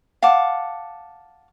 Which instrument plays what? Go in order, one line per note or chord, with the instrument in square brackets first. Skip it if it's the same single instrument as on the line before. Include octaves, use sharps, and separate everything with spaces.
[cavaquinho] F5 F#5 A5 D6